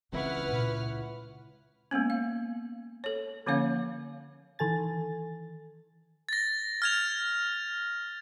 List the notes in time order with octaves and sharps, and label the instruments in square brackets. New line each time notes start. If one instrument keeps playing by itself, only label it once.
[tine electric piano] C#2 E4 C#6 [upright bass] E3 C4 [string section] B4 F#5 F6
[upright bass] A#2
[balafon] G#3 A#3 B3 C#4
F5
A4 C#5
D3 F3 A#3 C#4 C#5 F5
[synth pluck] D#3 E3 A4 G#5 A6
[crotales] A6 A#6
F6 G#6 F7